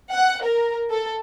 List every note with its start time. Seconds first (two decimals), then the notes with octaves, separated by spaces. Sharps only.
0.14 F#5
0.45 A#4
0.91 A4